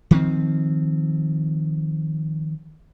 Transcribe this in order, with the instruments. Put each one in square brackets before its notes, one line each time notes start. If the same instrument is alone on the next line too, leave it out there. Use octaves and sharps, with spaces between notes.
[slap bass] D#3 F3 C4